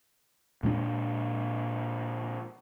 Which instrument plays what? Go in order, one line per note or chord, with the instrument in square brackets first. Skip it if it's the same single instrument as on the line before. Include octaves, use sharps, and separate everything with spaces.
[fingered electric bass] A#2 G#3 B3 D4